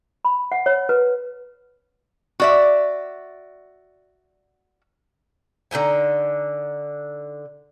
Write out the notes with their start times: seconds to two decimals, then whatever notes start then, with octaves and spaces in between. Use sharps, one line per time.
0.25 B5
0.52 F#5
0.66 C#5
0.89 B4
2.40 F#4 D5 E5
5.71 D3 D#4 E4 G#5